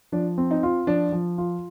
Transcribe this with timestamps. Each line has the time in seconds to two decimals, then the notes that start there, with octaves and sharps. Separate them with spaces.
0.12 F3 D4
0.38 C4
0.51 D#4
0.63 F4
0.87 F3 D4
1.12 F3
1.38 F4